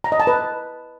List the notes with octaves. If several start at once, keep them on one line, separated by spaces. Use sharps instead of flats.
A#5
D#5
A5
B4